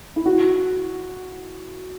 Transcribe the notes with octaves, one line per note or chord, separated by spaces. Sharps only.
E4
F#4